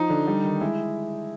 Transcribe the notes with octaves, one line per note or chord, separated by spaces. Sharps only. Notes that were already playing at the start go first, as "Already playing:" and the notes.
Already playing: F3 D#4
D3
G3
D#3
G#3 E4